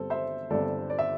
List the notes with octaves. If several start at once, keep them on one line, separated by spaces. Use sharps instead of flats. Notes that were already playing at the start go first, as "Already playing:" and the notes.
Already playing: G1 G2 G3 C4 A4
C5 E5
G1 G2 G3 C4 A4 D5
D5
E5